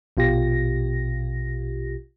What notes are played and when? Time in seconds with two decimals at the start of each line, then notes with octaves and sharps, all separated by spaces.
0.17 A#1 B2 F4 G4 A#6